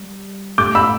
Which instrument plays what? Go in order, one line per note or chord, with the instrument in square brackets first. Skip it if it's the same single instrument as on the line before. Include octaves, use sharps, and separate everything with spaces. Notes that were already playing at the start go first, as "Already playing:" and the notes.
Already playing: [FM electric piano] G3
[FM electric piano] A2 A3 G4 [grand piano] D6 G6
[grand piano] B5 E6